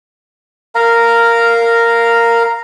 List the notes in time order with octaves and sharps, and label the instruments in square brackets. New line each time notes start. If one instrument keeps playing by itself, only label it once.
[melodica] A#4 F5 A#5